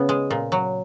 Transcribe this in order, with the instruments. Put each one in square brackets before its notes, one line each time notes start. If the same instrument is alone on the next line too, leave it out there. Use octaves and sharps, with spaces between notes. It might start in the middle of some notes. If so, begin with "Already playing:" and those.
Already playing: [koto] C#3 B3
G#3
A#2
F#3